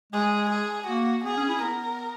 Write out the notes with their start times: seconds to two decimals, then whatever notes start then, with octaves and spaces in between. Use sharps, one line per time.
0.12 G#3 G#4
0.50 G#4
0.87 A#3 F#4
1.24 B3 G#4
1.37 C#4
1.49 E4
1.62 B3 A#4